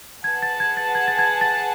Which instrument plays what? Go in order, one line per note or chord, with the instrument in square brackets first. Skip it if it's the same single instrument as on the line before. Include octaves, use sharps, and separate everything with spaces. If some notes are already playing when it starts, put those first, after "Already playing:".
[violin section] G#4 B4 F#5 A5 [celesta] G#6
[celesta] A6
G#6
A6
G#6
A6
G#6
A6